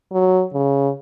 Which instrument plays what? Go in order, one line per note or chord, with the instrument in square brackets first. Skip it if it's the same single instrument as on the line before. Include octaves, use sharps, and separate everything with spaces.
[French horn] F#3
C#3